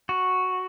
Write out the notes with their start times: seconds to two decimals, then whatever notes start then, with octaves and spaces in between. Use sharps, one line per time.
0.09 F#4